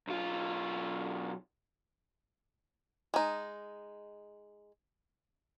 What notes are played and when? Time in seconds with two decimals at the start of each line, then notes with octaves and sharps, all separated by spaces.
0.07 B1 F4
3.14 G#3 D#4